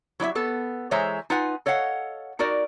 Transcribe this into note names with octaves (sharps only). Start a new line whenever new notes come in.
F#3 E4 D5 E5
B3 A4
E3 G#3 C5 C#5 E5 A#5
D#4 F4 B4 F#5 G#5
A4 C#5 D#5 F5 F#5
D#4 F#4 A#4 D5